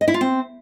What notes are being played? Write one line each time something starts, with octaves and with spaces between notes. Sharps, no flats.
D#5
E4
F4
C4